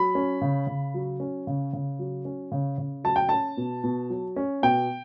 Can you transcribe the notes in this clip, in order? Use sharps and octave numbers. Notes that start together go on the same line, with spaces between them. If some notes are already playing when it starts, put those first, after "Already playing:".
Already playing: F#3 B5
C#4
C#3
C#3
F#3
C#4
C#3
C#3
F#3
C#4
C#3
C#3
F#3 A5
G5
C#4 A5
B2
B2
F#3
C#4
B2 G5